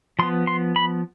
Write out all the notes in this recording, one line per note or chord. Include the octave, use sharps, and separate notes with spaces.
F3 B3 C6
C6
B5